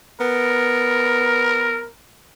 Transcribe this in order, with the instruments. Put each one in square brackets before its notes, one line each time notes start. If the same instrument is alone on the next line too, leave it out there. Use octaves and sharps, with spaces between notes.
[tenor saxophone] B3 [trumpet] A#4